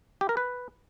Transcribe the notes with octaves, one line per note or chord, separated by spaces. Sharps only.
G4
A#4
B4